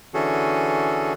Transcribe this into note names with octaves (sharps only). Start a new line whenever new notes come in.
D3 E3 C#4 F#4 G#4 A4